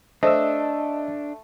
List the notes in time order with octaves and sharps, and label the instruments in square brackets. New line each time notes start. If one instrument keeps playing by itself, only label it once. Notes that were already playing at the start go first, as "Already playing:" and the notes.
[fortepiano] A3 [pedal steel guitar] D4 [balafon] C5 [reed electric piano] D#5 E6